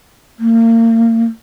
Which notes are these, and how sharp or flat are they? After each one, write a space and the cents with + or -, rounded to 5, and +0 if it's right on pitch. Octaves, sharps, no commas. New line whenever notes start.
A#3 -35